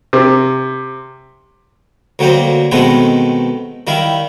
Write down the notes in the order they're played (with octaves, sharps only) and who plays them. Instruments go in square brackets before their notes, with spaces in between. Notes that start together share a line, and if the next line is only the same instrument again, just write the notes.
[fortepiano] C3
[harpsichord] D2 F#3 G3 A#3 C5
B2 D#3 G#3 A3 B3 C4
D#3 G3 E4 F5